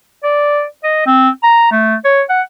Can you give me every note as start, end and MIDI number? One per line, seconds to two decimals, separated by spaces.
0.24 0.64 74
0.83 1.06 75
1.06 1.29 60
1.43 1.70 82
1.71 1.95 57
2.04 2.21 73
2.29 2.41 78